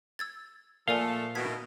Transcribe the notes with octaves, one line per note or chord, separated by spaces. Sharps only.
E6 G#6 A6
A#2 F3 A3 A4 A#4 D5 F5 G#5
B2 D#3 E4 G#6 B6